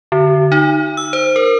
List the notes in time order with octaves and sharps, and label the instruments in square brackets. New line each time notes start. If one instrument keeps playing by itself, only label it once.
[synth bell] D3
D#4
E6
C5
A#4